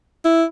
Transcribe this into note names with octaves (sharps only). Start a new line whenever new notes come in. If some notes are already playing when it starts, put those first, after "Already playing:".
E4